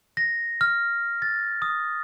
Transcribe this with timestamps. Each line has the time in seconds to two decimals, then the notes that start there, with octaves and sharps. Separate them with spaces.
0.17 A#6
0.61 F6
1.22 A6
1.62 D#6